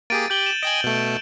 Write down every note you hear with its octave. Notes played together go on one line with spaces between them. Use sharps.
A#3 G4 G#4 A6 D7 D#7
G4 G6 F#7 G7
E7
D#5 G5 G#5 D7 F#7
B2 A3